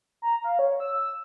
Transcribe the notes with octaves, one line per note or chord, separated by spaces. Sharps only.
A#5
F5
C#5
E6